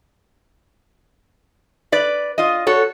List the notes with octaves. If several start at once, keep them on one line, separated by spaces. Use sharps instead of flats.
B4 D5
F4 D#5
F#4 A4 C#5